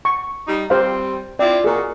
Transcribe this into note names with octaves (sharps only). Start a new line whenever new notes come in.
C#6
G3 D#4
G3 C4 G4 C5 F5
C4 E4 F4 D5
A#2 F#4 G#4 A#4